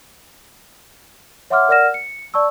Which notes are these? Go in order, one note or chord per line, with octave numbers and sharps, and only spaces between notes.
C#5 E5 F#5 C6 D6 F6
A#4 D5 F#5 F6 A#6 E7
C#7
D5 A5 C#6 E6